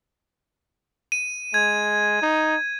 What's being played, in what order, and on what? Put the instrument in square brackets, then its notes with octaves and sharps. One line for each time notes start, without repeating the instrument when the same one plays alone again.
[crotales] D#7
[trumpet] G#3 [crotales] G#6
[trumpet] D#4